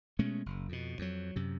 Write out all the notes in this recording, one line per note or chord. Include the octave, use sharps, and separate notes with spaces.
B2 G#3 A3 C#4
F#1
F2 B2
F2 F#3
F#2 C3